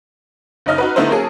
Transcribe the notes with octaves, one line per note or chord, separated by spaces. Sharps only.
F#1 C#4 D#4 D#5 F6
D#4 F#4 B4
D3 A3 B3 D#4 E4 C5
F#3 A#3 C#4 G#4 A4